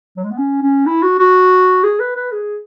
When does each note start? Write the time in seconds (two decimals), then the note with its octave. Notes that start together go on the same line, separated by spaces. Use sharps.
0.17 F#3
0.24 G#3
0.31 B3
0.38 C#4
0.62 C#4
0.86 E4
1.03 F#4
1.19 F#4
1.84 G#4
2.00 B4
2.16 B4
2.32 G#4